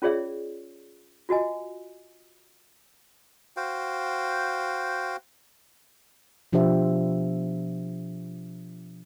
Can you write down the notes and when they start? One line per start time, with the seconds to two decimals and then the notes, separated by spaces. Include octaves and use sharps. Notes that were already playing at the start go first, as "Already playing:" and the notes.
0.02 C#4 F4 G#4 C#5 D5 E5
1.29 F4 F#4 D#5 G#5
3.57 F#4 C5 F5 G5
6.53 B2 F3 D4 G4 C5 E5